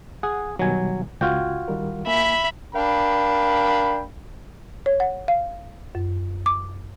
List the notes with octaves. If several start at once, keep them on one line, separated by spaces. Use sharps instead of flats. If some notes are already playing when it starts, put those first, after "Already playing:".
G#4 F#5
B2 D#3 F#3 G3 G#5
C#2 F4 F#4 G5 G#6
D#3 G3 A#4
A#3 E5 G#5 B5
D4 A#4 F5 G5 B5
C#5
F#5
F5
F#2
D6